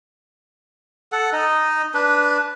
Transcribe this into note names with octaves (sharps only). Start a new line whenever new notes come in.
A4 F#5
D#4 D#5
D4 B4